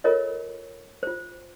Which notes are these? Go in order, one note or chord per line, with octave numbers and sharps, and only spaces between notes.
F4 A4 A#4 C#5 D#5
F4 C5